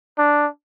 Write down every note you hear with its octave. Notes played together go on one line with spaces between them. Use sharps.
D4